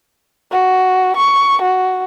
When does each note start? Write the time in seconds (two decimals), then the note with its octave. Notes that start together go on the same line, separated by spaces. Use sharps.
0.52 F#4
1.16 C#6
1.62 F#4